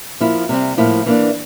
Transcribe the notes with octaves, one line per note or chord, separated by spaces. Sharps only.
F3 A#3 E4
C3 G3 C4
A2 F3 A#3 E4
E3 A#3 D4